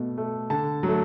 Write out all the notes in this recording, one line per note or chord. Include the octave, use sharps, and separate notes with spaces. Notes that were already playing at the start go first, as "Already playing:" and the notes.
Already playing: B2 A3
A3
D3 A5
F#3
A3